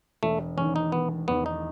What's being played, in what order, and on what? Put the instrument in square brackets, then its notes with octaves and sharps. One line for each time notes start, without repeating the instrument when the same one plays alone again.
[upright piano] E1 [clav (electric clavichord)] A3
[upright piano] E2 D#3 [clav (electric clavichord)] C#4
[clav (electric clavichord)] D#4
[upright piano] E1 [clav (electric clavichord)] B3
[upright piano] E2 D#3 [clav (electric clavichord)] B3
[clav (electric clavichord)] D#4